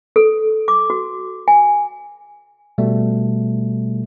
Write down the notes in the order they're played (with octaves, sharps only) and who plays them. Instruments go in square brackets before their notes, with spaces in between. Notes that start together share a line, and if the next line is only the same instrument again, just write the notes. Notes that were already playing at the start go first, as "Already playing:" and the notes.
[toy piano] A4
D6
F#4
G#5
[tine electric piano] B2 G3 A3